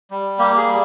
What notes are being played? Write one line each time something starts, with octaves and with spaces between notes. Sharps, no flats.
G3
A#3 G4
G#4
G3